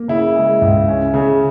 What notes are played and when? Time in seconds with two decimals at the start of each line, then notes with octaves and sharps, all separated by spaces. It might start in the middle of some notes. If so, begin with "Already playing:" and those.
Already playing: A#3
0.08 C#3 E4
0.36 G#3
0.62 C#2
0.88 C#4
1.14 C#3